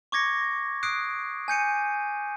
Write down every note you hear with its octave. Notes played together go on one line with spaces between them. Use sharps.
C#6 D6 G#6 A#6 C#7
D#6 F#6 C7 D7
G#5 G6 C#7 D#7